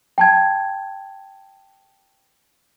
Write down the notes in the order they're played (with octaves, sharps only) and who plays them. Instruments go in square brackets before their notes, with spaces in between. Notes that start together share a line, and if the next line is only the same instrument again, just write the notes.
[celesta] G5 A5 G#6